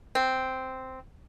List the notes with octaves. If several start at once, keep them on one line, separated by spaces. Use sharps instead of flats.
C4